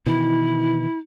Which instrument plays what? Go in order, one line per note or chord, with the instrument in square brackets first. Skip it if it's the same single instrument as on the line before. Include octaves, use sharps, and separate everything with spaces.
[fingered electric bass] B2 D#3 E3 [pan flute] E4